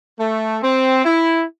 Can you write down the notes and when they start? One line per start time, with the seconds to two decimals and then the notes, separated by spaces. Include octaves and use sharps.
0.19 A3
0.62 C4
1.05 E4